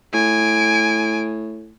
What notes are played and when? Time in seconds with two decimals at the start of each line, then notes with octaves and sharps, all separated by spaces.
0.14 A2 G#5 D7